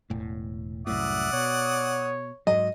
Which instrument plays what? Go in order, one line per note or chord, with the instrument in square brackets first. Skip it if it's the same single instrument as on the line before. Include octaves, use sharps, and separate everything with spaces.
[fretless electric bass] E1 A2
[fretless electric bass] C2 F#2 A2 [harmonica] D5 F#5 D#6 [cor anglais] E5
[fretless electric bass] B2 [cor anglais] C#5
[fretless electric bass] G#2 F#3 [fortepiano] D#5